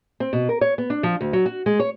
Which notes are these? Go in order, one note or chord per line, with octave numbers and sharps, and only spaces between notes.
C4
B2
A#4
C#5
B3
D4
F3
D2
F#3
F#4
G#3
C#5